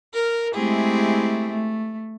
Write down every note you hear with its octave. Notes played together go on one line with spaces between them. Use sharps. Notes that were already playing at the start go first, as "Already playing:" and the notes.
A#4 F6
G#3 A3 C4 E4 G4 G#4
A3